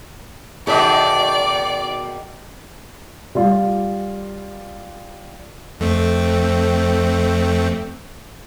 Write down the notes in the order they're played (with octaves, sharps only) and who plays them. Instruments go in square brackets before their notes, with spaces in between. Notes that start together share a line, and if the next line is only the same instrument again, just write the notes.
[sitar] B2 D#3 [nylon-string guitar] G#4 A4 E5 [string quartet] D5
[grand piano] G3 F4
[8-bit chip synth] F2 A3 C4